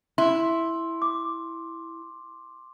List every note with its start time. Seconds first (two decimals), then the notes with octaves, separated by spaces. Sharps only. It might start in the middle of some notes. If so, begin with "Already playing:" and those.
0.18 E4 C6
1.02 D6